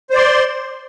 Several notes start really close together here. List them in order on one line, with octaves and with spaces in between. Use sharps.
C5 D5 C6